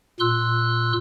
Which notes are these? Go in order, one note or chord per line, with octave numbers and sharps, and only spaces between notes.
A#2 C6 E6 F#6